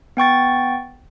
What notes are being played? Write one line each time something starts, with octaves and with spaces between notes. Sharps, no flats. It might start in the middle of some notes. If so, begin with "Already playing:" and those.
B3 G5 C#6 A6